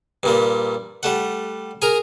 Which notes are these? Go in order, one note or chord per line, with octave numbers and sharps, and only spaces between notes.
G2 A#2 G3
G3 A3 F#5
G#4 A#4 A#5